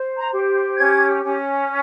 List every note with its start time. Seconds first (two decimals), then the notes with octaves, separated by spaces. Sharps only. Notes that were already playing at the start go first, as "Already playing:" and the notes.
Already playing: C5
0.18 A#5
0.33 G4
0.77 C#4 G#6
1.23 C#4